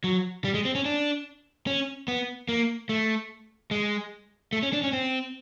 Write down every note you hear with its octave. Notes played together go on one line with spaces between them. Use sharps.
F#3
G3
G#3
C4
C#4
D4
C#4
B3
A#3
A3
G#3
A3
C#4
D4
C#4
C4